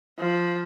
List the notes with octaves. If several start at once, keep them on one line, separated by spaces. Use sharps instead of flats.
F3